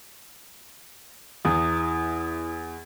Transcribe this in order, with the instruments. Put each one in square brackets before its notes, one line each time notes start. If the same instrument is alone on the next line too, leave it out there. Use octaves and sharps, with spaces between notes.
[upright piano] E2 [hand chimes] E4 D#6